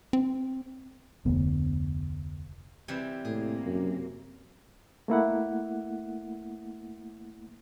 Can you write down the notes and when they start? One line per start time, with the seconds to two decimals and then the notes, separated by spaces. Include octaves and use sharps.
0.13 C4
1.25 F1 D2 B3
2.88 C3 E3 G3
3.25 A2 C3 A#3 G#4
3.66 F#2
5.08 A3 A#3 E4 F#5